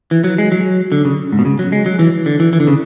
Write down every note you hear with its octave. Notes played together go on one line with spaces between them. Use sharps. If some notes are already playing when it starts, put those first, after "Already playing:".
E3
F#3
G#3
F#3
D3
C#3
G#2
B2
C#3
F#3
G#3
F#3
E3
D3
E3
E3
D3
C#3